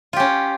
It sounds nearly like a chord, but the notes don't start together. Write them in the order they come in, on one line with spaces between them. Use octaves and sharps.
F4 G4 C#4